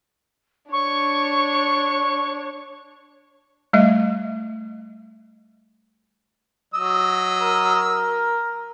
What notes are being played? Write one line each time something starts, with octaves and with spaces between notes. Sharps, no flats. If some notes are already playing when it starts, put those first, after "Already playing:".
D4 C#5 C#6
G3 A3 D#5 E5
F#3 D#5 E6
A#4